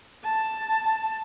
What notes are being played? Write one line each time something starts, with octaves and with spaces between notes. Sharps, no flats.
A5